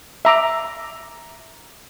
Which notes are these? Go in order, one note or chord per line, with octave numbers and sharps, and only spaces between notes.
E5 A#5 D6